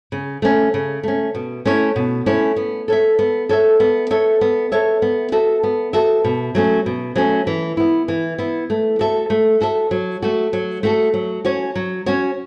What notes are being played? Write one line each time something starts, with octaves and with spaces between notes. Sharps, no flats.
C#3
A3 C#4
C#3
A3 C#4
B2
A3 C#4 E4 C#5
B2
A3 C#4 E4 C#5
B3
A4 C#5 E5
B3
A4 C#5 E5
B3
A4 C#5 E5
B3
A4 C#5 E5
B3
F#4 A4 E5
B3
F#4 A4 E5
B2
F#3 A3 C#4
B2
F#3 A3 C#4
E3
B3 E4
E3
B3 E4
A3
F#4 A4 E5
A3
F#4 A4 E5
F#3
A3 F#4 A4
F#3
A3 F#4 A4
F#3
C#4 F#4 C#5
F#3
C#4 F#4 C#5